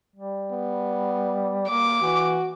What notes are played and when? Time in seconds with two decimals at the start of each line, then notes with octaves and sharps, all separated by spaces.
0.16 G3
0.52 B3
1.69 A#3 D6
2.02 E3 F#4